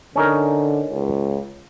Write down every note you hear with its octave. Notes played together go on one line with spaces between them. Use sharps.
D3 C#4 D#4 A#4
C#2